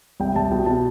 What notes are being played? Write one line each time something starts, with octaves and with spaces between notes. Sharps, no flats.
C2 G5
C2 A5
B2 G5
B2 A5